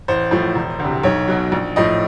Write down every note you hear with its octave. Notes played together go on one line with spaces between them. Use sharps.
A1 C5
A2 F3
E1
D2 C3
B1 C#5
B2 F#3
A#1
A2 F3 D#5